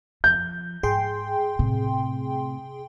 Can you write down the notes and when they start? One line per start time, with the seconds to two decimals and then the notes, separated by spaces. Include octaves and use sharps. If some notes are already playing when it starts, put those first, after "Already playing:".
0.24 F3 G6
0.83 G#2 G#4 G5 C6
1.59 A2 C3